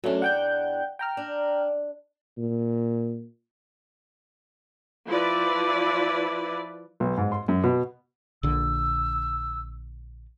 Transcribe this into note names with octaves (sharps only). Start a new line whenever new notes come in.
E2 F#3 A3 C#4 D4
F#5 G5 G6
G5 A#5 F6
D4
A#2
F3 E4 B4 D5
B1
G#2
C6
F#2
B2
A#1 D3 E6